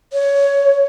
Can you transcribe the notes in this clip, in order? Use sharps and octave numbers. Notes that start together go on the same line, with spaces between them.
C#5